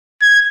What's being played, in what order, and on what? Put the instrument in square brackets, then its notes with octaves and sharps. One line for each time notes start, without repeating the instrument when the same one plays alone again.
[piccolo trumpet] G#6